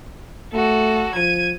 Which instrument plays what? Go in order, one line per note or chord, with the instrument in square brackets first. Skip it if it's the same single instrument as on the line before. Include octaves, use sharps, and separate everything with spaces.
[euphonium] A3 [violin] F#4 A4
[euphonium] F3 [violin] G#6 D#7